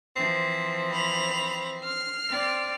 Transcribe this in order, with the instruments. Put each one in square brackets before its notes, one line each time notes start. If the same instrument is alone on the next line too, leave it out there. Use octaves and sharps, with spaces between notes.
[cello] E3 F3 [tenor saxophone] C4
[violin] B5 F7
F6 C7
[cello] C4 D5